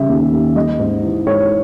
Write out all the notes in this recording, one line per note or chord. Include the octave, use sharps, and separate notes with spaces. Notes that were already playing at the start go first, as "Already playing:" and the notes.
Already playing: C#3 G3 E5
D#2
D#2
G3 D#5
G#2
E3
G#2 C#5